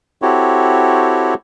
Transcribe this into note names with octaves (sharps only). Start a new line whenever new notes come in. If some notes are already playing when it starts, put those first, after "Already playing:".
C4 E4 F#4 G4 A4 C#5